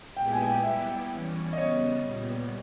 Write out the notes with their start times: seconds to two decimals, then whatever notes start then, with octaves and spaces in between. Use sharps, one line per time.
0.17 A#2 G#3 B3 E4 G4 G5
0.32 G#5
0.42 G#5
0.48 G5
0.64 G3 B3 E4 G4 E5
1.10 E3 G3 C#4
1.53 D#5
1.57 C#3 G3 B3 C#5
2.05 A#2 G3 B3